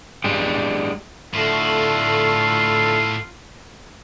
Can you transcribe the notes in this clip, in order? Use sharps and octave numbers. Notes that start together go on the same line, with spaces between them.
G#3 D4 G4
A2 D3 A3 F4 F#4 A4